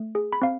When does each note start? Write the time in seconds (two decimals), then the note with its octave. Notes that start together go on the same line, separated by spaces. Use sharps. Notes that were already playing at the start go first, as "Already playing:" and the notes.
Already playing: A3
0.15 G#4
0.33 B5
0.42 C4 F5